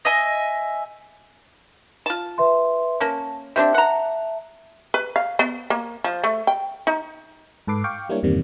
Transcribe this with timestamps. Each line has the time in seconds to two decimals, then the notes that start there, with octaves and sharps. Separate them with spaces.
0.05 D#5 E5 G#5
2.06 F4 A5
2.38 B4 E5 C6
3.00 A#3 C#4 A5
3.56 G3 C4 D4 E5 A5
3.74 F#5 A#5
4.94 B4
5.16 F5
5.39 B3
5.70 A#3
6.04 F3
6.24 A3
6.47 G5
6.87 D#4
7.67 G#2 A4 B4 D6 C7
7.84 F5 G5 C#6 D6
8.09 G3 A#3 D4 E4 C#5
8.23 E2 G2 C3 D#3 G3 A#3